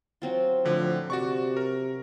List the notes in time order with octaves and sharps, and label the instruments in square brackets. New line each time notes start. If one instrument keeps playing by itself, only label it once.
[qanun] F#3 C4 F4
[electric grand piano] A2 D3 [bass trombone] F3
[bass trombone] C3 [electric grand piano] F#4 D5 C#6
[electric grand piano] A#4